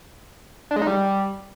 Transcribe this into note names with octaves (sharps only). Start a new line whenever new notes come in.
D4
G#3
D#4
G3